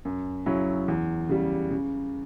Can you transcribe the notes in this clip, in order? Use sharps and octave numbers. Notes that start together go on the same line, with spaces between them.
F#2
C#3 F#3 C#4 E4
E2
C#3 G3
C#3